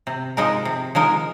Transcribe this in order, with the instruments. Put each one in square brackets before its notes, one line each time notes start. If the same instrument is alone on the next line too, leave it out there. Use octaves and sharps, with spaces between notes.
[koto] C3
F3 G#3 D#4 A#4
C3
F3 G#3 D#4 A#4